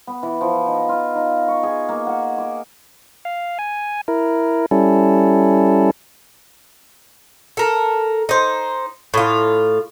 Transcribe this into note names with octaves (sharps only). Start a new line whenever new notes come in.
B3
E3
F3
D#4
F4
D#4
C#6
G#4
A#3
F#5
D6
F5
G#5
E4 A#4
G3 C#4 E4 A4
A4 A#4
D#4 C5
A2 F4